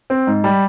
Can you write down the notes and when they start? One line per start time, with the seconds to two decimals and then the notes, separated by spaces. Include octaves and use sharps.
0.10 C4
0.27 G#2
0.44 G3